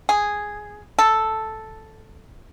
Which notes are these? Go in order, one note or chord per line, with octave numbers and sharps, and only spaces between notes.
G#4
A4